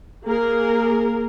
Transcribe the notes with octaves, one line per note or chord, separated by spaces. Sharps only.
A#3 G#4 A#4